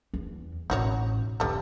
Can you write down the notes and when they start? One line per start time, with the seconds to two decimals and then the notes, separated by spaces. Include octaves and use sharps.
0.14 E2
0.70 E1 A1 D#4 F#4 C#5
1.40 F2 D3 G3 A4